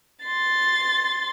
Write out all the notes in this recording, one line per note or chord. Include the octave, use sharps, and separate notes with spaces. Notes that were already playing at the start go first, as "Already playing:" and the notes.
C6 A6